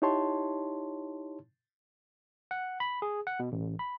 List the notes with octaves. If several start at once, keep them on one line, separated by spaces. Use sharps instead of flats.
D#4 E4 G4 C#5 A5 C6
F#5
B5
G#4
F#5
B2
A1
B5